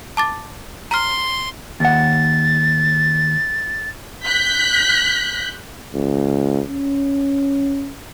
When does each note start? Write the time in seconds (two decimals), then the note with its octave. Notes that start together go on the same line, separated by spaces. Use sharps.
0.17 A5 D6 A6
0.91 A#5 C6 F6
1.80 D#2 F#5 A6
4.26 F#6 G6 B6
5.94 C#2
6.69 C#4